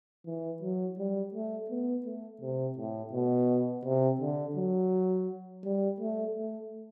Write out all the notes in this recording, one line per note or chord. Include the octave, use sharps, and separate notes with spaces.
E3
F#3
G3
A3
B3
A3
C3
A2
B2
C3
D3
F#3
G3
A3
A3